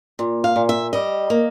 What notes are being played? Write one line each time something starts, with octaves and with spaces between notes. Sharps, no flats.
A#2
F5
A#2
E5
G3 D#5
A#3